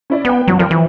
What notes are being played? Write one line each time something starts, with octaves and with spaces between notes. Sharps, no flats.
C#4 E4 D5
B3 B4 G5
C2 F#2 F#3
F3 A#4 G5
E3 F3